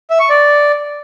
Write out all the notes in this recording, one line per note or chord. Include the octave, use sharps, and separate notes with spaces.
E5
C#6
D5